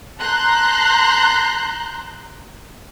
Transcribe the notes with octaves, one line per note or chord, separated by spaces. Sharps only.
A5 A#5 C6 F#6 G6